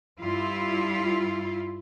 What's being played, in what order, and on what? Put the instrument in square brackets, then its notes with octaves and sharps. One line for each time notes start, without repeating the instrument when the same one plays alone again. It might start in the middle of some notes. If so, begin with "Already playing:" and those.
[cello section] G2 E4 F4